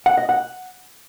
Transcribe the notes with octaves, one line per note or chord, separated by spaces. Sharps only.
F#5
D#5
F#5